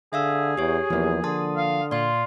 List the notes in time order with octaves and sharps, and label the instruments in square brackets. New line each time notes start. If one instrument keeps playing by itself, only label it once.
[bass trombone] D3 [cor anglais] G#4 [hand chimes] E5 F5 E6
[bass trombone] E2 [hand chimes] G4 C#5
[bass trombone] E2 [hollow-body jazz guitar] F3 A#3
[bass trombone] D3 [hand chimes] A5 C6 D#6
[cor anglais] F5
[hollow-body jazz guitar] A#2 [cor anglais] F4 [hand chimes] D5 C6